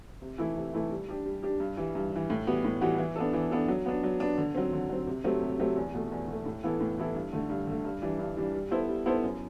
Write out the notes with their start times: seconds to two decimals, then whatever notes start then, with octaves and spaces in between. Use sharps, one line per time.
0.22 C3
0.38 E3 A3 E4
0.56 C3
0.74 E3 A3 E4
0.91 G3
1.09 D4 G4
1.25 G3
1.43 D4 G4
1.60 G2
1.77 E3 G3
1.95 G2
2.12 E3 G3
2.30 A2
2.47 E3 G3 B3 F#4
2.64 A2
2.81 E3 G3 B3 F#4
2.98 E3
3.16 B3 D4 A4
3.33 E3
3.51 B3 D4 A4
3.68 F#3
3.86 B3 D4
4.03 F#3
4.20 B3 D4
4.38 D3
4.55 F#3 C4
4.73 D3
4.89 F#3 C4
5.07 C3
5.24 F#3 A3 C4 G4
5.42 C3
5.59 F#3 A3 C4 G4
5.76 E2
5.94 B2 A3
6.12 E2
6.28 B2 A3
6.46 A2
6.64 E3 B3 E4 A4
6.80 A2
6.98 E3 B3 E4 A4
7.15 G2
7.33 D3 A3
7.49 G2
7.67 D3 A3
7.85 G2
8.02 E3 G3 D4
8.19 G2
8.37 E3 G3 D4
8.54 G3
8.71 B3 E4 A4 C5
8.89 G3
9.06 B3 E4 A4 C5
9.23 F#2